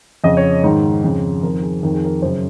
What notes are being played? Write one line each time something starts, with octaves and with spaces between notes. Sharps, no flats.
F2 C#3 D#5
C#5
G#2 D#3
F2 C#3
F2 D#3 A#4
G#4
F2 D#3 A#4
G#4
A#4
F#2 C#3 C5